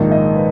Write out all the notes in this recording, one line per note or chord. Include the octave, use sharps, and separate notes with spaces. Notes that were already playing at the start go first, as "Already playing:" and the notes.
Already playing: A#1 G#2 D#3 A#3 D#4
D#5
B4